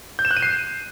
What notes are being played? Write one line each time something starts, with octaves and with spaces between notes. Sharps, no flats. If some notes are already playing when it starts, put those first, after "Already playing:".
G6
E7
F#6
D#7
C7